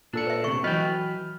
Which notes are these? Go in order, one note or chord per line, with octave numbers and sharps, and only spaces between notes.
A#2 D4 A4 C#7
B4 E5
D2 C3 G#4 C#6
E3 F#3 B4 D#5 G5 F6